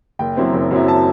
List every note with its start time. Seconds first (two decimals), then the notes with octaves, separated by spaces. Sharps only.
0.19 F#1 G5
0.37 F#2 F#3 C4 E4
0.53 F#1
0.71 F#2 F#3 C4 E4
0.88 A5